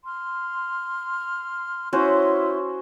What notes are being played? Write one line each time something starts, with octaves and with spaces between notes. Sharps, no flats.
C6 F6
C#4 E4 F#4 C5 C6